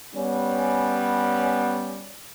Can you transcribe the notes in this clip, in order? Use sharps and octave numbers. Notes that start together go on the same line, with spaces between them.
G3 B3 C#4